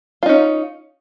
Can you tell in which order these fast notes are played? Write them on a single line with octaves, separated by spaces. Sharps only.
F4 D#4 C#4